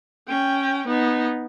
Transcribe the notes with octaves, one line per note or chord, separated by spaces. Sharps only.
C#4 G5
B3 D#4